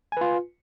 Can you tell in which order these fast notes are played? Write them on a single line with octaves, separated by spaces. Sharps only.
G#5 B4 F4